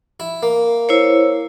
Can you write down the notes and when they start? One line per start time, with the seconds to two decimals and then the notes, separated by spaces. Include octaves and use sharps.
0.20 E4
0.43 A#3
0.89 E4 C5 C#5